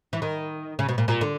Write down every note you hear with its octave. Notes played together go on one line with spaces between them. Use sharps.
E3
D#3
C#3
B2
A#2
A#2
D3